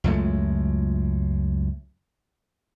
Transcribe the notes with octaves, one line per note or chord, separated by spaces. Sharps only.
C#2 F#2 G#3 A3